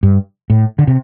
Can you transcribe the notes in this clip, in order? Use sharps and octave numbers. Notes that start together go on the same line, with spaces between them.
G2
A2
D3
C3